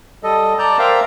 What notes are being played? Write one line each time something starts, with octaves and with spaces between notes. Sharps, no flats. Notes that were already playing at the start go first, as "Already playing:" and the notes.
G3 A4 D#5
D5 A5 A#5 G6
A#4 C5 E5 F5 G5 A#5